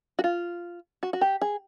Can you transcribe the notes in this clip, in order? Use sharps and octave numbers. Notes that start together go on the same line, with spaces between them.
F#4
F4
F#4
F#4
G4
G#4